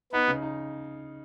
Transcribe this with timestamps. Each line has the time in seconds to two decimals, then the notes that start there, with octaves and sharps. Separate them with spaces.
0.12 B3 D#4
0.28 C#3
0.42 D#4